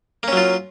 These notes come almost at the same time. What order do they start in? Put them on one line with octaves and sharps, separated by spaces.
A#3 C#4 F#3 F4